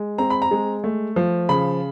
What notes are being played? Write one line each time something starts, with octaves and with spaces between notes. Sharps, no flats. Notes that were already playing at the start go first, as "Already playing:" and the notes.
Already playing: G#3
C4 A#5
B5
A#5
G#3
A3
F3
C#3 B5